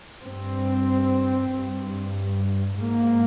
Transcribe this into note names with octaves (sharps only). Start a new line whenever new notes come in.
G2 C4
G2
G#2 A#3